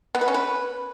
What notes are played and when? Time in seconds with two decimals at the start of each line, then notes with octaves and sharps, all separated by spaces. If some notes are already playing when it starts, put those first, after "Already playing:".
0.15 B3
0.21 B4
0.28 C#4
0.34 B4